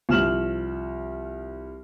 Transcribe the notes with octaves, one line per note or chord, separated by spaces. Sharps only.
C2 F3 F6 E7 F#7